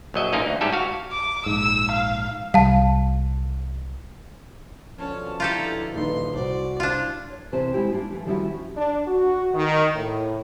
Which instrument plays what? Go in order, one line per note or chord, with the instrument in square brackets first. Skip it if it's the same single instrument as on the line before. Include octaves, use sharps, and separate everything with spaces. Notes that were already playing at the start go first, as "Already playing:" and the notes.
[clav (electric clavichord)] A#1 F#3 D#5 E5
A1 A#3 C#4 D#4 F4 A#4
D2
G#2 G3 A3 G4 A4 G#5
F#4 F5
[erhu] D6
[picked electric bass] A#1 G#2 [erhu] E6
[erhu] F5
[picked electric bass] C2 G3 [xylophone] F5 A5
[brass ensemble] B2 D3 F3 [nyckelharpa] C#4 A5
[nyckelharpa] E4 A#5 [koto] F4 G4 A4
[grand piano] D#1 D#4 B4 [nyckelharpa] C6
[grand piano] C2 [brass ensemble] F#4 C5 [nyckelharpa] D5
[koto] D4 F4 [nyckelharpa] E4
[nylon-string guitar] C#5
E2 C3 E3 C4 C5 A5
G#3 E4 G4 G5
A#3 D4 F4
E3 A3
D#3 F3 G3 C#4 E4 F#4
[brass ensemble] D4
F#4
D#3
A2